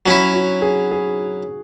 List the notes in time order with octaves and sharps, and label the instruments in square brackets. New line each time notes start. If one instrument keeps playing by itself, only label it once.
[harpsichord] F#3 C#4 E4
[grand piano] F#4
G#4
G#4